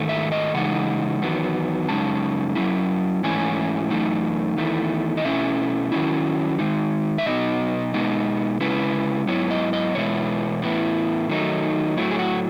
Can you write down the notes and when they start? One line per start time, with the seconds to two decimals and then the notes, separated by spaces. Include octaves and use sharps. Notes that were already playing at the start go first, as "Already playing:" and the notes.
Already playing: G#2 D#3 A3
0.09 E5
0.32 D#5
0.54 C#3 E3 G#3 D#4 F#5
1.22 E2 D#3 F#3 B3
1.89 F#2 C#3 G#3 D#4 A5
2.55 F#2 C#3 F#3 C#4 E4
3.23 G#2 E3 A3 C#4 E4 G#5
3.90 F#2 E3 A3 D#4
4.57 E2 D#3 A3 E4
5.17 D#5
5.25 B2 A3 C#4 E4 E5
5.92 D#3 F#3 C#4 E4
6.59 D#3 G#3 D#4
7.18 E5
7.26 B2 F#3 B3 D#4 D#5
7.94 B2 G#3 B3 D#4
8.61 C#3 G#3 C#4 E4 B4
9.27 G#2 F#3 B3 E4 C#5
9.51 D#5
9.73 D#5
9.95 E2 B2 G#3 B3 E4 C#5
10.62 A2 E3 B3 E4
11.29 D#3 F#3 A3 D#4
11.97 A2 F#3 A3 E4
12.11 G#4
12.19 F#4